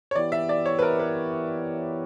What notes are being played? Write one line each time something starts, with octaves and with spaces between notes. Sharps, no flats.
C#5
E3 B3 E4 G4 D5
E5
D5
C#5
B4
A#4
B4